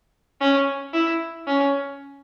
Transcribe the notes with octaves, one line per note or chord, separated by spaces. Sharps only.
C#4
E4
C#4